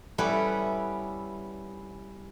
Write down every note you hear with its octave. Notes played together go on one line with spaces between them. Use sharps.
G3 B3 C#4 E4 A4 B4